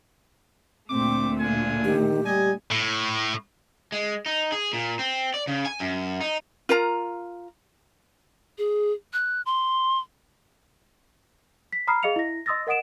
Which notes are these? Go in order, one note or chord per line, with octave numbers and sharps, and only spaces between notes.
D2 A#2 A3 C4 G5 D6
D4 F4 G#5
D#3 G4
G3 D#5 G#5
A2
G#3
D#4
G#4
A#2
C4
D5
C#3
G#5
F#2
D#4
F4 A#4 F5 A#5
G#4
F#6
C6
B6
A#5 B5 D#6 F6 C7
G#4 D#5 F5 C#7 F7
E4 A#6
D#5 C6 D#6 E6 A6 A#6
A#4 D#5 F#5 D#6 D7 E7